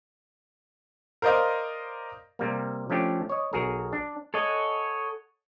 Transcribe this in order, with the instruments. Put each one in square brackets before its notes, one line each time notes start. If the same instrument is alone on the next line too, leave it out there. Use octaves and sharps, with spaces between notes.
[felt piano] A#4 C5 D5 D#5 F5
[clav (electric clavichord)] C3 G3 A#3
F3 A3 C#4 D4 G4
C#5 D#5
B1 F#4 G#4 A#4
D4
[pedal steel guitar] A4 C#5 D#5 F#5 G#5